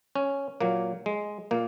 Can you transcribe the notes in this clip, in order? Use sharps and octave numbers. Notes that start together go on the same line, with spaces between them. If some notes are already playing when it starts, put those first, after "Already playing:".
C#4
A#2 F#3 A#3
G#3
A#2 A#3